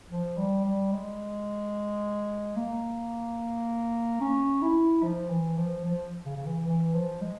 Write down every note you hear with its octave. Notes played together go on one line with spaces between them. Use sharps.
F3
G3
G3
G#3
A#3
C#4
E4
F3
E3
F3
F3
C#3
C#3
E3
E3
F3
G#3